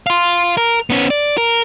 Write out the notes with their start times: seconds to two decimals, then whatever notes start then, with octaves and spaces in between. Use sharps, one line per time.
0.07 F5 C6
0.57 A#4
0.90 B3 C#4
1.10 D5
1.38 A#4